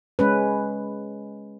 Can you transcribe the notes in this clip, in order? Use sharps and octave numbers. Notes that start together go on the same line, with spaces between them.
G#3 C#4 B4